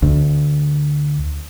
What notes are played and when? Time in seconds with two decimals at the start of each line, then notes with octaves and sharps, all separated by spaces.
0.02 D2